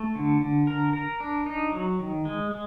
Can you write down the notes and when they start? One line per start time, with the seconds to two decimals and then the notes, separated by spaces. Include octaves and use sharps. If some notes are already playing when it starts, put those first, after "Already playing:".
Already playing: A3
0.15 D3
0.41 D3
0.67 A#4
0.93 A#4
1.20 D4
1.46 D#4
1.72 F#3
1.99 D#3
2.25 G#3
2.51 G#3